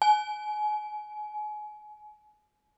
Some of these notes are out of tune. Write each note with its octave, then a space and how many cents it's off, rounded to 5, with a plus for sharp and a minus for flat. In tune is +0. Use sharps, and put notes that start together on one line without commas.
G#5 +30